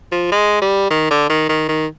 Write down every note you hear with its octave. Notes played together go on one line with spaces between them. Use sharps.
F3
G#3
G3
D#3
D3
D#3
D#3
D#3